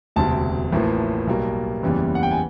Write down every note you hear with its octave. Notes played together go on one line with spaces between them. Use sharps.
E1 D2 C3 A5
A1 A2 F3 A#3
B1 B2 G3 A#3
F#1 E2 C#3 E3 G3
F#5
G5
G#5